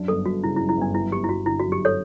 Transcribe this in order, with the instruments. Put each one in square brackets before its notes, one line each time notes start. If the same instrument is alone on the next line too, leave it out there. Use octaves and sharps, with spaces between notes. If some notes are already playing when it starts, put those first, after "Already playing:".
Already playing: [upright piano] F#2 D4
[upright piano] G1 [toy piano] A4
[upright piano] G1 [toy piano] F#4
[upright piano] C#3 [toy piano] E4
[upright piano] F#2 [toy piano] E4
[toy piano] E4
[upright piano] G1 [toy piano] D4
[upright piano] F#2 [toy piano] E4
[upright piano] G1 [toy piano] G4
[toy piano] E4
[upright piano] G1 [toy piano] F#4
[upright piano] D3 [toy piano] E4
[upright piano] F#2 [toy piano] F#4
[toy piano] G4
A4 C#5